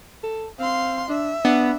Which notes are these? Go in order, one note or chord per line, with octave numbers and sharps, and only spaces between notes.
A4
C4 F5 C6
D4 E5
B3 D4